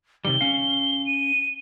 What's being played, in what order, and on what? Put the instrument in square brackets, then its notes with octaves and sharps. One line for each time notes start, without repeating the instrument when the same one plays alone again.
[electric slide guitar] C3 D#3 G3 [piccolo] G7
[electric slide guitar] C#4 F5
[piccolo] D#7